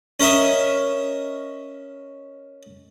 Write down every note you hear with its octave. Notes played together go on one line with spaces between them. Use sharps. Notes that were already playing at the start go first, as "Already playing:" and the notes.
C#4 A#4 D#5 E5